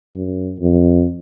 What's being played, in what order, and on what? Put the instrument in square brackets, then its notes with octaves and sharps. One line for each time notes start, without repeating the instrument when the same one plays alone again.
[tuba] F#2
F2